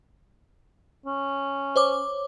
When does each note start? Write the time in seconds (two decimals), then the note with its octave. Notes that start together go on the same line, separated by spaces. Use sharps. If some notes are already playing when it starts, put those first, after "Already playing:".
1.06 C#4
1.76 C5 C#5 D6